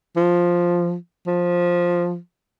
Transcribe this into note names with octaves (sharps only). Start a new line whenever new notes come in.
F3
F3